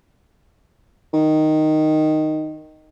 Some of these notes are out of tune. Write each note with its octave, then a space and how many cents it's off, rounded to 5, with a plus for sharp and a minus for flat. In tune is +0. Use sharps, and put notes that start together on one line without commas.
D#3 -5